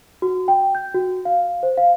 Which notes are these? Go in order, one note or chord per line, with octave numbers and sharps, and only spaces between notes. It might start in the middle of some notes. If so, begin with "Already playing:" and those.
F#4
G5
G6
F#4
F5
C5
F5